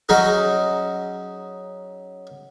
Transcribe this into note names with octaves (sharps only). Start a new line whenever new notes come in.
F#3 C#4 D#4 G#4